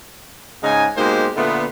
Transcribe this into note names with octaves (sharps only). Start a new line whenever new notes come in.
G#2 C#3 D#4 D#5 G#5
B2 G#3 A#3 D#4 G4 C5
A#2 D3 A3 B3